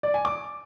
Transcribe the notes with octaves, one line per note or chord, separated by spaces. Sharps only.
D5
G#5
D6